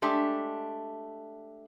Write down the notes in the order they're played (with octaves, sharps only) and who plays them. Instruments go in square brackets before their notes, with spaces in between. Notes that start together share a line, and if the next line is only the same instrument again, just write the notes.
[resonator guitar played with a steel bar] G#3 A3 D4 G4 E5